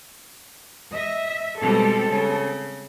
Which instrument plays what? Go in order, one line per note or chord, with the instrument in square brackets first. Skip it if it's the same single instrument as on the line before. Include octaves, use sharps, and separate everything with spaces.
[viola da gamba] D#5 [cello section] E5
[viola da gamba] B2 G3 G#3 [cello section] C4 A4
[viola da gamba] C#3